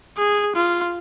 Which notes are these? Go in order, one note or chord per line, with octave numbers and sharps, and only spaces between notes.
G#4
F4